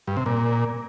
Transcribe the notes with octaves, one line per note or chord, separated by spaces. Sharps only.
G2
C3
A#2